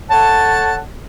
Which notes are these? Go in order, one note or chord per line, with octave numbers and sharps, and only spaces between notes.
A4 C#5 F#5 A5